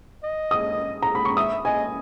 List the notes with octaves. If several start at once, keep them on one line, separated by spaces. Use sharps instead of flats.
D#5
D#6
A#5
B5
C#6
E5 D#6
D#5 G#5